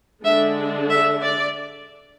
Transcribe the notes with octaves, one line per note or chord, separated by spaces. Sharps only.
D3 G#3 D4 E5
E5
D5